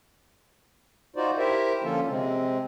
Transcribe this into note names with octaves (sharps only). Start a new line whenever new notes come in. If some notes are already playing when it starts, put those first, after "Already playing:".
D#4 F4 F#4 C5 D5
E4 G4 A#4 C5 E5
D3 F3 A#3 C#4 F4 A4
C3 G#3 C4